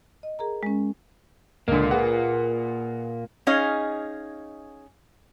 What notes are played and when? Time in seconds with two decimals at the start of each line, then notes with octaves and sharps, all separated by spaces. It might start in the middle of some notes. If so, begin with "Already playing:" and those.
0.23 D#5
0.39 G#4 A#4 A#5
0.63 G#3 C#4
1.68 C#2 A#2 D3 A#3
1.91 G#4 B4 F#5
3.47 C#4 D#4 G#4 D#5 F5